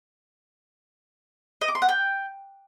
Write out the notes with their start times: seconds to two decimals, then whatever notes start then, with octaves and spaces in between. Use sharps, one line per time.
1.61 D#5
1.68 D6
1.75 C6
1.82 F#5
1.89 G5